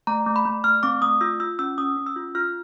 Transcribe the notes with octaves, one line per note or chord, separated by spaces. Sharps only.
A3 A#5
A3
B5
A3
A3 F6
C4 D6
A3 D#6
F4 E6
F4 E6
C#4 E6
C#4 D#6
C#4
E6
F4
F4 F6